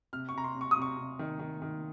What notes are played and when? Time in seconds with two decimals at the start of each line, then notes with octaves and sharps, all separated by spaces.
0.13 C3 F6
0.29 C#6
0.34 C3 A#5
0.44 C6
0.55 C3
0.61 C#6
0.71 D#6
0.77 C3
0.82 C#6
0.97 C3
1.19 D#3
1.39 D#3
1.62 D#3